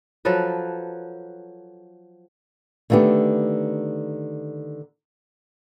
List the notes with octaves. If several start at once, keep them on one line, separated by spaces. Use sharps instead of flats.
F3 F#3 A4 B4
D3 D#3 A3 B3 G4